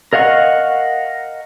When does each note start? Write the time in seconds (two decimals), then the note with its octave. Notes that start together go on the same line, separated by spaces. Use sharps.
0.13 A#4 D#5 F5 F#5 C#6